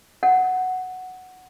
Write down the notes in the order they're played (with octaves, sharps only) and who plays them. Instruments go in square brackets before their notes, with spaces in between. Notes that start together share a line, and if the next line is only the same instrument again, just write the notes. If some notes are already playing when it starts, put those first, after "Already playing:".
[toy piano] F#5